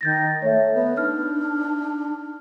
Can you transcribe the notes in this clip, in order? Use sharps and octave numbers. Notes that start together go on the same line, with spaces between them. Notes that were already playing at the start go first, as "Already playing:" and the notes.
D#3 G6 A6 A#6
A3 C#5 E5
B3
D4 D#4 F6